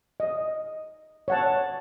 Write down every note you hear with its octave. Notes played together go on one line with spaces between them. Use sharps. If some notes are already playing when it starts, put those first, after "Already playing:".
D#5
C#5 F#5 A5